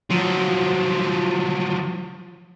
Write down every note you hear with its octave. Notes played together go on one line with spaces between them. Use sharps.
F3 F#3